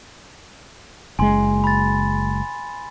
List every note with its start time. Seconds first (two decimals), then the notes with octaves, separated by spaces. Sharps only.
1.19 F#1 G#3 G#5 C6
1.64 B5 A6